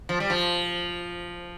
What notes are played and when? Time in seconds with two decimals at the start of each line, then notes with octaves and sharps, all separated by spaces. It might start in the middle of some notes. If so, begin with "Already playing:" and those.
0.09 F3
0.20 G3
0.30 F3